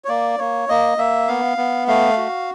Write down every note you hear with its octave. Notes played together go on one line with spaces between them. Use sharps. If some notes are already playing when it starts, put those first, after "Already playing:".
C#5
A#3 D5
A#3 C#5
A#3 D#5
A#3 E5
B3 F5
B3
A3 F5
F#4